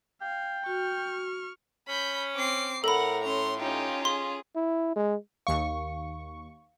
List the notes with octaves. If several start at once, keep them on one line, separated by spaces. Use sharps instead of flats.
F5 G5
F#4 C#6 F6
C#4 B5 G6
C4 D6 C7
A2 A4 A#4 F#5 A#5 B5
C#4 A#5 C6
C#4 D#4 F4 G4
G#4 C6
E4
G#3
D#2 F5 C#6